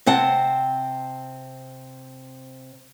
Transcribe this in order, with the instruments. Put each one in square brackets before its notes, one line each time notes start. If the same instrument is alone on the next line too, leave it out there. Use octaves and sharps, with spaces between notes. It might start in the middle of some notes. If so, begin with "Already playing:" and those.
[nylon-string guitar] C3 C4 F#5 A5